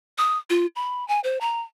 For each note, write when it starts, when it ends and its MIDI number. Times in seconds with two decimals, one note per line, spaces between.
0.18 0.38 87
0.50 0.66 65
0.76 1.07 83
1.08 1.20 80
1.24 1.38 72
1.41 1.62 82